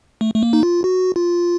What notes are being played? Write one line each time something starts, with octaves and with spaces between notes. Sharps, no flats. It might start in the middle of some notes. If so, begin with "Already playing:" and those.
A3
A3
A#3
D#4
F4
F#4
F4